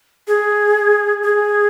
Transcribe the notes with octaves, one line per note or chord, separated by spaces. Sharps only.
G#4
G#4